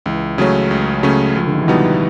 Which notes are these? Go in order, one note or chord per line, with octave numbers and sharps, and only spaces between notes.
C#2 E3
C#3 F#3 A3 C#4
C#2
C#3 F#3 A3 C#4
C#2 F3
D3
D#3
E3
B2 F3 G3 B3 D#4